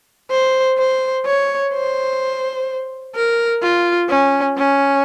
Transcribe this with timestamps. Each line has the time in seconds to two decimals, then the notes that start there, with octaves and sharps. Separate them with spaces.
0.31 C5
0.78 C5
1.25 C#5
1.73 C5
3.16 A#4
3.62 F4
4.10 C#4
4.57 C#4